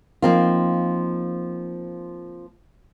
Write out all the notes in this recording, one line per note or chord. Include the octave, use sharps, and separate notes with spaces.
F3 A#3 C4 D#4 F4